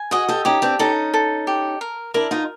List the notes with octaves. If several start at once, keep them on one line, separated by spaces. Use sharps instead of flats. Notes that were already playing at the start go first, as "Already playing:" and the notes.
Already playing: G#5
F#4 G#4 D#5
G4 A4
C#4 D#4 G4
C4 D4
C#4 D#4 A4
A4
G4
A#4
D4 E4 A#4
D#4 F4